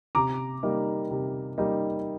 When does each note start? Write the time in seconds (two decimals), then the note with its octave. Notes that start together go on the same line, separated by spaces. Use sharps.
0.15 C3 A#5 D6
0.63 G3 A#3 D#4
1.11 C3
1.58 G3 A#3 D#4